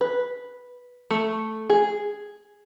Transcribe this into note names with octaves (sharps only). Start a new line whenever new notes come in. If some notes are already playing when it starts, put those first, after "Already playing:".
B4
A3
G#4